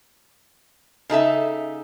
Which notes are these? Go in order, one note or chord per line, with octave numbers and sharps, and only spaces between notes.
C#3 D#4 A4 E5